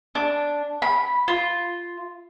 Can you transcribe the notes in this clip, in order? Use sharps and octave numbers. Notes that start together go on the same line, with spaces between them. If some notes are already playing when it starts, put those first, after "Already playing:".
D4
B5
F4